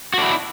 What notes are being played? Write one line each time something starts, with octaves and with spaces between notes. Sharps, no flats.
D4 E4 F#4